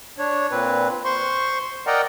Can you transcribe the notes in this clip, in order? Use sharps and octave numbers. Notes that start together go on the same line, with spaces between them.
D4 C#5
A#2 C4 B4
C5 C6 C#6
A#4 D5 D#5 F#5 G5 A#5